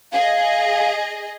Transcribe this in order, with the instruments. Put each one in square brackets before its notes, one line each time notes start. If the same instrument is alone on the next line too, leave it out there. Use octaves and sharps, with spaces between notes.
[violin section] G#4 D#5 [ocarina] F5